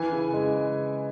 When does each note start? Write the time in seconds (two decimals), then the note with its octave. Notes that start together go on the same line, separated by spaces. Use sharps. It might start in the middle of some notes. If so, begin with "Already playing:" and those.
Already playing: E3 G#5
0.12 C#3
0.33 G#3